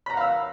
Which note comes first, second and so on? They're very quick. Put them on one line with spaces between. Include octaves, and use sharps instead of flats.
B5 A#5 F#5 F5 E6